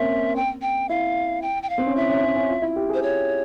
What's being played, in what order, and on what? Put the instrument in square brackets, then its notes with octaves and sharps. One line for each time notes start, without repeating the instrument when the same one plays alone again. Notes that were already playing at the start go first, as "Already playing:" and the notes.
Already playing: [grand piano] A#3 C4 C#4 [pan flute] E5
[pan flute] G5
G5
[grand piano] E4 [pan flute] F5
[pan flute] G5
G5
F5
[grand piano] C4
C#4
[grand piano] E4 [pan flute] E5
[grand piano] C#4
C#4
C#4
F4
E4
G4
[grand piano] G#4 [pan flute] C5
[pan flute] C#5